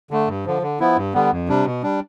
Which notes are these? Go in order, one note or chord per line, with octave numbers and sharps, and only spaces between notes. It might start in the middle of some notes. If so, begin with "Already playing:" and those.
D3 A3
G2
D3 F3
D3
F3 B3 E4
G2
D3 G3 B3
F2
C3 G3 D4
B2
G3 D4